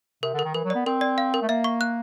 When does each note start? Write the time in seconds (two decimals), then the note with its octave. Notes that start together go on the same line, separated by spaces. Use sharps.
0.23 C3 A#4
0.33 D3
0.39 A#4
0.44 D#3
0.54 E3 A#4
0.64 F#3
0.70 B3 D5
0.86 C4 A#4
1.01 D5
1.18 F5
1.34 A#4
1.42 A3
1.49 A#3 E5
1.64 C#6
1.81 F#6